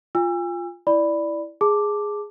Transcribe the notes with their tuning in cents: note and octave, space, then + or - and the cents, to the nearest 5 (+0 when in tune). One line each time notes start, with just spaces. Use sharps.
F4 +0 G#5 -40 E6 +30
E4 +0 D5 +0 B5 +0
G#4 +0 A5 +0 D6 +0